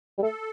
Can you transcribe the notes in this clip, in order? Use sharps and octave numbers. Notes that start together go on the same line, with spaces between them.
G3
A3 A4